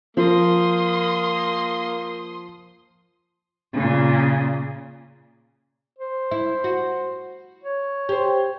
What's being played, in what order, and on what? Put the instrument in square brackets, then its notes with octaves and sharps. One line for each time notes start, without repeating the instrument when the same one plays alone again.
[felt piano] F3 [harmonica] A#3 [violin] C6 D#6
[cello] A#2 C#3
[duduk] C5
[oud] E4
F#4
[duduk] C#5
[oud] G4 C5